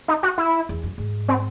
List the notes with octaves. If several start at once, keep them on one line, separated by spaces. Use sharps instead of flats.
D#4
F#4
E4
E2
F#2
G#2
C4